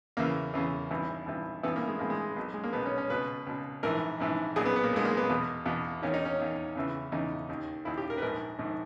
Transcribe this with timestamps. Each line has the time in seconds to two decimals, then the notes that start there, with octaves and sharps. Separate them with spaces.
0.17 E2 C#3 E3 A#3
0.54 E2 C#3 E3
0.91 G#1 G2 E3
1.26 G#1 G2 E3
1.63 G#1 G2 E3 B3
1.76 A#3
1.88 G#3
1.99 G#1 G2 E3 A#3
2.10 G#3
2.36 B1 B2
2.54 G#3
2.64 A#3
2.73 B1 B2 B3
2.86 C#4
2.98 C#4
3.10 C#2 B2 B4
3.47 C#2 B2
3.83 A#1 G#2 E3 A#4
4.20 A#1 G#2 E3
4.56 B1 A#2 G#4
4.65 B3
4.76 B3
4.84 A#3
4.93 B1 A#2 G#3
5.05 A#3
5.17 B3
5.29 E2 B2
5.66 E2 B2
6.02 E2 D#3 C#4
6.14 D#4
6.25 C#4
6.39 E2 D#3
6.75 E2 C#3 E3
7.12 E2 C#3 E3 D#4
7.49 D#2 D#3
7.85 D#2 D#3 E4
7.97 G4
8.10 A#4
8.18 B4
8.22 A#1 G#2 D#3 A#4
8.59 A#1 G#2 D#3